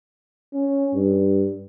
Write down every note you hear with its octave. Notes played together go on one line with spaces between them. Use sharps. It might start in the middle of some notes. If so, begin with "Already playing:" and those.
C#4
G2